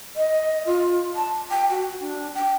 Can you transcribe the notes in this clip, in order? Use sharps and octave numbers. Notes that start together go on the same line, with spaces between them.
D#5
F4
A5
G5
F#4
D4
G5